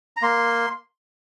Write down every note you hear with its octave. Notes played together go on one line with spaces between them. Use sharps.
A#5
A#3 C6